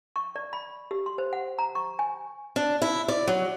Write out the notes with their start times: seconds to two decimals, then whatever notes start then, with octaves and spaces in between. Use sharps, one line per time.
0.16 C#6
0.36 D5
0.53 B5
0.91 G4
1.06 C6
1.18 C5
1.33 F#5
1.58 A#5
1.75 C#6
1.99 G#5
2.56 D4
2.82 E4
3.08 D5
3.28 F#3